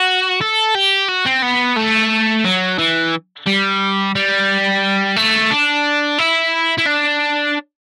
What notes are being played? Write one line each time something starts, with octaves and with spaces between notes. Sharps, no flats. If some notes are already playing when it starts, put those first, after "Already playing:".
Already playing: F#4
A4
G4
F#4
C4
B3
A3
F#3
E3
G3
G3
A3
D4
E4
E4
D4